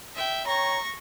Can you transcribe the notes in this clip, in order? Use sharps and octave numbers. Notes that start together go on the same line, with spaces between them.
E5 G5
C#5 G5 A#5 C#6 A#6